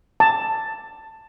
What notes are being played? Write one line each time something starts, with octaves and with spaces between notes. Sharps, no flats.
A5